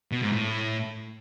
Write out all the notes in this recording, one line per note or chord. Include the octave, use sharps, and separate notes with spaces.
B2
G#2
A2